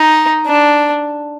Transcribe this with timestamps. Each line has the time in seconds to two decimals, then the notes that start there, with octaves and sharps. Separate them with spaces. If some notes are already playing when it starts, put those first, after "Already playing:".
Already playing: D#4
0.47 D4